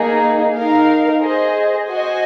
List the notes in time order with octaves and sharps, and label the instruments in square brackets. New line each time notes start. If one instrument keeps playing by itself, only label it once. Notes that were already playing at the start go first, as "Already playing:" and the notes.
Already playing: [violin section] A#3 D#4 G#4
D#4 A#4 F5
G#4 C5 D#5
F#4 C5 D#5 G#5